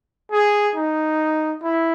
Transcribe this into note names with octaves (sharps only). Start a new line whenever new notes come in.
G#4
D#4
E4